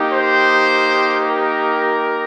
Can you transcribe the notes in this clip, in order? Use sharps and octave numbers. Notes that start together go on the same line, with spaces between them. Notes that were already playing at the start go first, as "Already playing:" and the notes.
Already playing: A#3 D#4 G4
C5
A#4